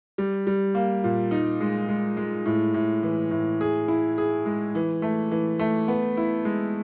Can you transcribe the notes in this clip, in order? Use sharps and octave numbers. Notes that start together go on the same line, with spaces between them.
G3
G3
A#3
A#2
D#4
G#3
G#3
G#3
A2
A2
E3
A2
G#4
E4
G#4
G#3
E3
A3
E3
A3
B3
E4
G#3